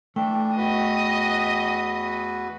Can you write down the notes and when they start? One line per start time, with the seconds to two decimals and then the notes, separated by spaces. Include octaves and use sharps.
0.16 E3 A3 D4 G5
0.57 E2 F#4 B4 D#5 D#6